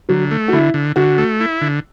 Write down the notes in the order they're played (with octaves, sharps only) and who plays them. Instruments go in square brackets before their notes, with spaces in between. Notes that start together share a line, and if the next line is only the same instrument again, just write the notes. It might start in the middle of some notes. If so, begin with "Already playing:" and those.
[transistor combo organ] D3 [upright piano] F#3
[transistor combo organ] A3
[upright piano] F#4
[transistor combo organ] D3 [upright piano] E4
[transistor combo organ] D3
[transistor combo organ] D3 [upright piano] F#4
[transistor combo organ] A3
E4
D3